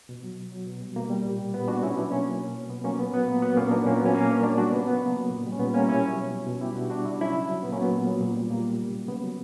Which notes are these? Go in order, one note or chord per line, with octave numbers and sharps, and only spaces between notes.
B2
F#3
B2
F#3
B2
G3
B2 A#3
G3
A#2
G3
A#2 B3
G3 D4 F#4
B2 C#4 E4
F#3 B3 D4
B2 A#3 C#4
F#3
B2
F#3
B2 B3
F#3 A#3 C#4
A#2 B3
F#3 B3
A#2 A#3
F#3 B3
A#2 A#3 C#4
F#3 B3 D4
A#2 A#3 C#4
B3
F#3 A#3 C#4
A#2 A#3 C#4
G3 B3 D4
A#2 D4 F#4
G3 D4 F#4
C#3 B3
F#3 B3
C#3 A#3
F#3
A#2
G3
C#4
A#2 B3
G3 A#3 C#4
B2 C#4 E4
F#3
B2
F#3
B2
G3 E4 G4
B2 D4 F#4
G3 D4 F#4
C#3 E4
D4
F#3 C#4 E4
C#3
F#3
A#2 B3
A#3 C#4
F#3 B3
A#2
F#3
A#2
G3
A#2 A#3
G3
C#3
F#3
C#3 B3
F#3